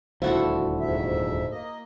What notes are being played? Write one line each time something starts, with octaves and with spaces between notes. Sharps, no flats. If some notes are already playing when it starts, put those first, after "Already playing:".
D#1 D2 F3 E4 F#4 A4
F2 G#2 E5
A#3 D#5